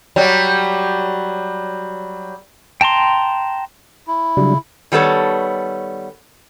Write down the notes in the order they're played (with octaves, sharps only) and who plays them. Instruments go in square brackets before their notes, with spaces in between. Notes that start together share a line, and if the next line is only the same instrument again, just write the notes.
[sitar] F#3 G3
[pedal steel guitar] G5 A5 A#5 C6
[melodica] E4
[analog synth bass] C#3 [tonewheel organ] F#3 G3 D4
[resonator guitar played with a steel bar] D#3 G3 B3 A4 C#5